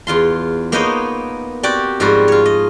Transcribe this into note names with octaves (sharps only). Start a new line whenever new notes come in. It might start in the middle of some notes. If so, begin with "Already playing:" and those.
E2 F4 C6
A#3 B3 D#4 C5 C#5 D#5
C4 F#4 G4 D5
G#2 F3 G3 F#4 C5
F4 C#5
D#5